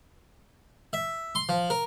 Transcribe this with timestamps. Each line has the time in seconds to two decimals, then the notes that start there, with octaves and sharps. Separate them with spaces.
0.93 E5
1.35 C6
1.49 F3
1.70 A#4